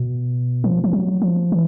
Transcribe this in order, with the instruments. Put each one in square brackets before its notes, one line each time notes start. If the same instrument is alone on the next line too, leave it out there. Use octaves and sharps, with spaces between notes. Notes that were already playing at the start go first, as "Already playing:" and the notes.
Already playing: [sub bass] B2
F3
F3
F#3
F3
E3